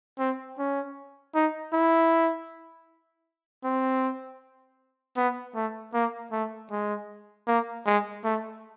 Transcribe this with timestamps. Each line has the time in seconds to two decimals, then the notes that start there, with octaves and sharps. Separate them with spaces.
0.19 C4
0.58 C#4
1.35 D#4
1.73 E4
3.64 C4
5.17 B3
5.55 A3
5.94 A#3
6.32 A3
6.71 G#3
7.47 A#3
7.86 G#3
8.24 A3